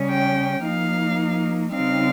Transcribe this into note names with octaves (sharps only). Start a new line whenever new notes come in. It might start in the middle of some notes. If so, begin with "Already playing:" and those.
Already playing: C#3 G3 C#4
G5
F3 A#3 D#4 F5
C#3 G3 C4 D#4 F5